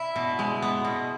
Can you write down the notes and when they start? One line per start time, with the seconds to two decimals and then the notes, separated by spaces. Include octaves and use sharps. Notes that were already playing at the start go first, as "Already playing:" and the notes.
Already playing: E4
0.16 B2
0.39 G#3
0.62 B3
0.85 B2